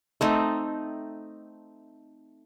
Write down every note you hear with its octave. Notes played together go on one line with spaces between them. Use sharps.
A3 C4 D#4